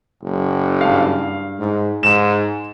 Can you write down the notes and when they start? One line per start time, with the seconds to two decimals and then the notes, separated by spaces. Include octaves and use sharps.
0.22 F#1
0.81 G2 F5
1.59 G#2
2.03 G#2 E7